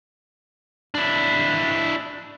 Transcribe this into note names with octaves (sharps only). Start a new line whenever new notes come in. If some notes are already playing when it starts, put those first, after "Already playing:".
D4 E4